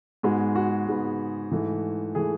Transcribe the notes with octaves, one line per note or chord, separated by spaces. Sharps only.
G#2 G#3 B3 F#4
F#4
G#2 G#3 B3
G#2 E3 A3
E3 A3 G#4